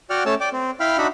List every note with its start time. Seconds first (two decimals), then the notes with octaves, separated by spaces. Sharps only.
0.10 F#4 D5 F#5 G5 F6
0.26 A3 C#4 C#5 A5 E6
0.40 D5 G5 D6
0.53 C4
0.80 E4 F5 G5 B5 F6
0.98 D4 D#4 F#4 E5 F#5 B5